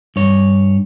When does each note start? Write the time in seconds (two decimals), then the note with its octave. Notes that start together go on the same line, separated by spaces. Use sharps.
0.16 G2 C#5